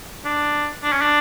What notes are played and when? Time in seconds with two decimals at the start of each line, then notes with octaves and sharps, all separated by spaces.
0.25 D4
0.84 D4
0.92 C#4
1.01 D4